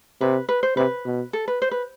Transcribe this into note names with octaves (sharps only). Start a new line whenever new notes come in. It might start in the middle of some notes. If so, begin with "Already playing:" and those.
C3 B4
B4
C5
C3 B4
B2
A4
B4
C5
B4